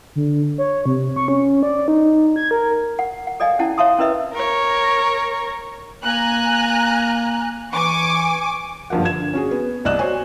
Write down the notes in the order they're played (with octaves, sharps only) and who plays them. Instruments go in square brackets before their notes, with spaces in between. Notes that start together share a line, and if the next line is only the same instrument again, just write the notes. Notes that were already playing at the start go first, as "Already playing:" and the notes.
[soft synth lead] D3
C#5
C3
C#6
C#4
D5
D#4
G#6
A#4
[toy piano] F#5
F#5
A4 D5 D#5 F5 G#5
C#4 E4 F#5 A5
C#5 E5 F5 A5 C6 D#6
C#4 E4 A#4 B4 D#5 E5
[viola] A#4 C#5
[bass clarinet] A#3 [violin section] G#5 A#5 F#6
[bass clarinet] E3 [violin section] G#5 C#6 D6
[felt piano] F#1 G2 F3 A#4 F#5
D3 G#6 E7
C#4 F#4 G#4
B3
C2 D5 D#5 F#6 E7
F#4 C5 C#5 G#5